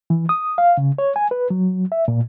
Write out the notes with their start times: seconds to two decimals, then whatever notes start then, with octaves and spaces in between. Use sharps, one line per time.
0.10 E3
0.29 D#6
0.58 F5
0.78 C#3
0.98 C#5
1.16 G#5
1.31 B4
1.50 F#3
1.92 E5
2.08 A#2